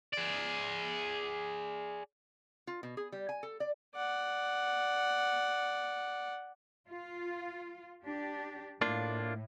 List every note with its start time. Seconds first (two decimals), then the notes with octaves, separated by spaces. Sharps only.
0.13 G#4 D5
2.67 F4
2.83 B2
2.97 G#4
3.12 G3
3.29 G#5
3.43 A4
3.60 D5
3.95 D5 F#5
6.89 F4
8.04 D4 G4
8.81 A2 A#3 D4 F4